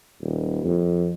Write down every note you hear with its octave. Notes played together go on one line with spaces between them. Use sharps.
D#1
F2